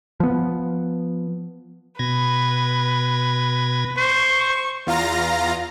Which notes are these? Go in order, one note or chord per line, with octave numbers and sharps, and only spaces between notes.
F3 B3
B2 B4 G#6 A#6
C5 C#6
E2 F4 F5 A#5 A#6